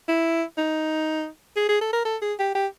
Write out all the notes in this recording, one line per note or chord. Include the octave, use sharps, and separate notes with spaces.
E4
D#4
G#4
G#4
A4
A#4
A4
G#4
G4
G4